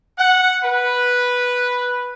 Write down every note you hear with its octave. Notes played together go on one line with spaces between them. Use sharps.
F#5
B4